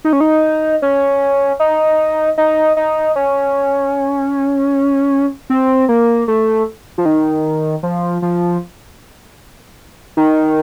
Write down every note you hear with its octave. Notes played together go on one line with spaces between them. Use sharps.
D#4
C#4
D#4
C#4
D#4
D#4
D#4
C#4
C4
A#3
A3
F3
D#3
F3
F3
D#3